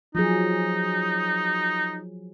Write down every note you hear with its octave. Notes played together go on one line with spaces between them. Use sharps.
F3 F#3 D#4 G#4